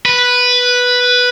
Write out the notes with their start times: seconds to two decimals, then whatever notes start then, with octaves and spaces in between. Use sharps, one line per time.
0.06 B4